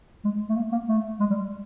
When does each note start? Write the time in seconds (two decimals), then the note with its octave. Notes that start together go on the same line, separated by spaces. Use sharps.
0.25 G#3
0.49 A3
0.56 A#3
0.72 A#3
0.88 A3
1.20 G#3
1.30 G3